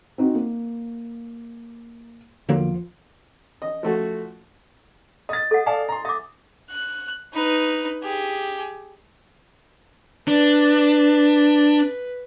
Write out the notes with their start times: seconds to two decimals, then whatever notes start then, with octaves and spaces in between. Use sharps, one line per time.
0.18 C4 D#4 F#4
0.34 A#3
2.49 E2 D3 F3 F#3 A#3 F4
3.62 D#5
3.83 F3 A3 F#4
5.29 D#5 D#6 A6
5.51 A4 F#5
5.66 D5 F5 G#5 A5
5.89 A#5 C6
6.05 E5 D6 D#6
6.70 F#6
7.34 D#4 B4
8.03 G4 G#4
10.28 D4 B4